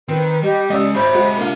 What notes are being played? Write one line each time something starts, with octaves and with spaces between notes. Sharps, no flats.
D#3 C4 B4
G3 G4 D#5
G#3 C#4 D5 D#5 D#6 E6
G#1 G4 C5 E5 B5
F#3 G#3 F#5
A#3 D4 F4